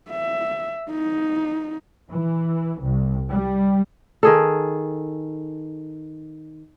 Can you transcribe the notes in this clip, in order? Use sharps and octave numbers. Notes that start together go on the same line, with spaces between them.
E5
D#4
E3
C2
G3
D#3 G#4 A4